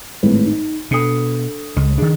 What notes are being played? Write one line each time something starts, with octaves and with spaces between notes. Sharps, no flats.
G#1 A2 B4
D#4
B2 D4 A4 D#6
C#2 G#3
D#3 D4 G#4